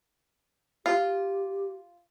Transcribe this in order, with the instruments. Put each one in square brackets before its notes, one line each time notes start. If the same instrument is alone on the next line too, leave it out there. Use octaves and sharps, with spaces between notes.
[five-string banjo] F4 [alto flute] G4